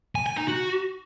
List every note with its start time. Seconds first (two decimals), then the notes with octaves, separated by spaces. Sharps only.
0.15 G#5
0.26 G#5
0.37 D#4
0.48 F#4